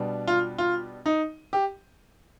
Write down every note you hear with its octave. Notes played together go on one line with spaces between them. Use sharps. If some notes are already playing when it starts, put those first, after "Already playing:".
Already playing: B2 G3 B3 D4
F4
F4
D#4
G4